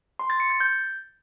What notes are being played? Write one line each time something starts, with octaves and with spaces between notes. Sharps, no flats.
C6
A6
C#7
A6
G6